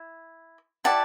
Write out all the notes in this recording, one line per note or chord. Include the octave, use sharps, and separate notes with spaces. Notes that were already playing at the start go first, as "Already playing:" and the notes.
Already playing: E4
E4 G4 D5 F#5 A5